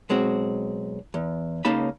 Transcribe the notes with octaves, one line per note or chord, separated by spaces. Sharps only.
B1 G#3 C4 F#4
E2
C#2 C#3 A#3 D#4 A5 B5